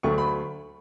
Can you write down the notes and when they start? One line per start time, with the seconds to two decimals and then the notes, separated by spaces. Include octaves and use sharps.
0.03 D2 D3 F#3 A3 C#6
0.18 B5